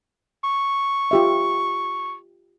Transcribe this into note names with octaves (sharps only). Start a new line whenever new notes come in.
C#6
F4 G4 E5